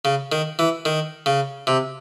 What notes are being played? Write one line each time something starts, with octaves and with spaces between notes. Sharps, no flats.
C#3
D#3
E3
D#3
C#3
C3